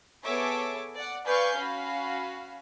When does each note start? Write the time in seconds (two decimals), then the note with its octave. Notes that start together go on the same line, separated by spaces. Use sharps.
0.24 B3 G#4 A4 C#5 E5 D6
0.95 D5 F#5
1.25 B4 D5 F5 G#5 C#6 G6
1.56 C#4 F#4 F5 B5